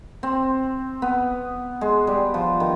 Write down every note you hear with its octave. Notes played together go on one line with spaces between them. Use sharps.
C4
B3
G#3
G3
F3
D#3